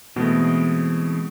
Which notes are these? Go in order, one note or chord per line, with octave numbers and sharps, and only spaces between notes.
B2 E3 G#3 A3 C4